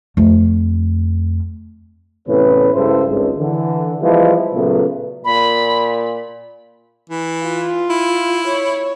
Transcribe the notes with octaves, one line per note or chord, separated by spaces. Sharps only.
F2 A3
E2 A2 C3 C#4 B4
G2 C#3 G#3 E4 A4 C5
G#1 C#2
D3 E3
E3 F3 G3 G#3 B3 E4
A#2 C#3 F#3 A3 B3
A#2 B5
E3
F4
E4
C#5